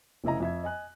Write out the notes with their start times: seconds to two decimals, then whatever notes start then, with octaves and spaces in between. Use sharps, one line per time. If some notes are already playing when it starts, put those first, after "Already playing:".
0.24 F1 C#3 E4 D#5 A#5
0.40 F2 E5 G#6
0.64 D#5 G#5 F#6